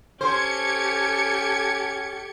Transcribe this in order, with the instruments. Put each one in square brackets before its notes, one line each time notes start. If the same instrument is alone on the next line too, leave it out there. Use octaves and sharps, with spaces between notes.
[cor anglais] C#4 [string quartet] G4 A4 [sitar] C5 [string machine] G#6 C#7